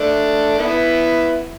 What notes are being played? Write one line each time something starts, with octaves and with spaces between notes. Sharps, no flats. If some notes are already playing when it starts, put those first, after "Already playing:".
Already playing: A3 D4
B3 E4